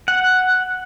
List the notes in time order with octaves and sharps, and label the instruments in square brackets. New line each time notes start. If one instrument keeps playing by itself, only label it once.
[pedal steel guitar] F#5